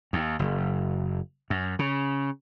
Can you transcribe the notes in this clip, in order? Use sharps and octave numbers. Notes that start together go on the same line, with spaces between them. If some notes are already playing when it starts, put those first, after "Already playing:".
D#2
F#1
F#2
C#3